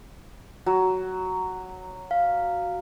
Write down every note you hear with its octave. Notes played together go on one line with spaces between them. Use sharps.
F#3
F5